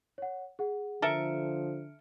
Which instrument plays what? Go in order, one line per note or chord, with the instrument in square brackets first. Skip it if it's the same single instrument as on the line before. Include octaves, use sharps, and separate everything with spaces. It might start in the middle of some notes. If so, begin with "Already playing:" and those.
[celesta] C#5 F#5
G#4 F#5
[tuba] D3 [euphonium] F3 [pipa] A4 A#4 E5 [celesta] F6 C#7 D7